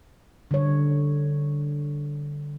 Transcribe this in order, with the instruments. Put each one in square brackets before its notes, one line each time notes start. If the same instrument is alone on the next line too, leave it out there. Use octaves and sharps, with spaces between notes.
[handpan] D3 G3 C#5